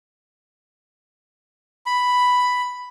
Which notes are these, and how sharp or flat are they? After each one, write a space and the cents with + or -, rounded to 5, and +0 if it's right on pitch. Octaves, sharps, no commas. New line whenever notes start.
B5 +5